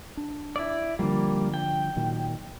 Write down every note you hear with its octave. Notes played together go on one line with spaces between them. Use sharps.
D4
E4 D5
D3 F3 G3 A#3
G5
A#2 D#3 F#3